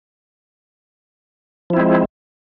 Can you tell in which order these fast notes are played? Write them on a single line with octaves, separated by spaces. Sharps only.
F3 E4 C4 G#3